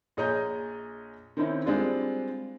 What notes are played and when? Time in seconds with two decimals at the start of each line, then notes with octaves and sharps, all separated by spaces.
0.17 A#1 G#4 C#5 D#5 A#5 G6
1.37 D#3 C4 C#4 D#4 E4
1.66 G3 G#3 C4 D4 F4